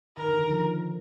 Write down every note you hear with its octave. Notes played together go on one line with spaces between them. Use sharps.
D#3 A#4
D3
D#3
F3